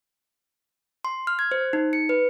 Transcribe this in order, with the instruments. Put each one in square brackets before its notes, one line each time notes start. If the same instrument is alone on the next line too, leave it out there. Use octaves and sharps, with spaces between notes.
[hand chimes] C6
F6
G#6
C5
D#4
C#7
B4